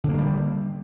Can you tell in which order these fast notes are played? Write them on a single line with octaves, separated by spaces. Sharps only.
D3 A#3 F#3 G3